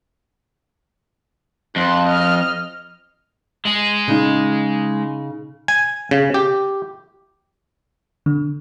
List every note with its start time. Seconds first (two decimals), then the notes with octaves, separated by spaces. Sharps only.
1.76 F2 C6 F#6
2.07 D#5 F6
3.65 G#3 G#4
4.08 C#3 D#4
5.68 G#5
6.11 C#3
6.34 G4
8.26 D3